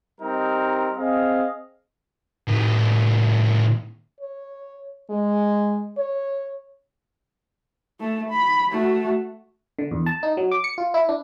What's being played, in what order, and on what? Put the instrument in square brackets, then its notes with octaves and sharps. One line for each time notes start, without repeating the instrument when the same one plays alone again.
[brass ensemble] G3 C4 D#4 A#4
C4 G#4 D#5 F5
[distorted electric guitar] A2 D#3
[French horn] C#5
G#3
C#5
[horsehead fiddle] A3 A4
B5
A3 F#4
[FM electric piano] D3
E2
A5
D#4
F#3
D6
C#7
F4
E4
D4